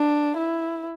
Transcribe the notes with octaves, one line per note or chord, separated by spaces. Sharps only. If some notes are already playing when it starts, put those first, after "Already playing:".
Already playing: D4
E4